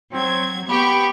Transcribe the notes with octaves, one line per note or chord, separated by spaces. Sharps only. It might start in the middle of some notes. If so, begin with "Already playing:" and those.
F#3 C4 G#6
B3 G4 B5 C#6